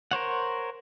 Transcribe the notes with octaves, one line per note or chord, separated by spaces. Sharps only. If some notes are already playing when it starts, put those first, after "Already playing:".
A#4 C5 C#5 F#5